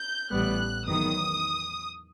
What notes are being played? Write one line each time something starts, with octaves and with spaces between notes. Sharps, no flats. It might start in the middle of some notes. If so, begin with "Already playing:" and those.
Already playing: G6
A1 A2 G3 B3 F#6
E2 D#3 F#3 B3 D#6